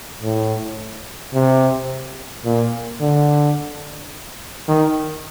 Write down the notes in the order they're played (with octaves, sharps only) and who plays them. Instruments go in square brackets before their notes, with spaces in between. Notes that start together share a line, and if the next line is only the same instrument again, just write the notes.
[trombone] A2
C3
A#2
D3
D#3